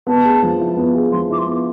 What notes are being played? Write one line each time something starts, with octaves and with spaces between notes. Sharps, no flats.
B3 A5
G#4
F3
E4
B3
G#4
F3 C6
E4 D6
C6
B3